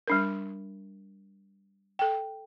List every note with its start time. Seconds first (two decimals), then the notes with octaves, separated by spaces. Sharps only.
0.08 G3 D4 A#4
1.99 A4 G5